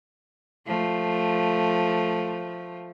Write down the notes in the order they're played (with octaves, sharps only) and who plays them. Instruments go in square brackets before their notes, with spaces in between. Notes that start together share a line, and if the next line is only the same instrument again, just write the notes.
[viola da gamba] F3 A3